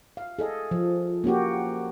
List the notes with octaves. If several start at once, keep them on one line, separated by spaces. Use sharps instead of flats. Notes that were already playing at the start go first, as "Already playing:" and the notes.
F5
G#4 A4 D#5
F3
A#3 C#4 F#4 G4